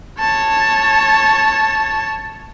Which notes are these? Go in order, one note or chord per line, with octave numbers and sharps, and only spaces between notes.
C#5 A5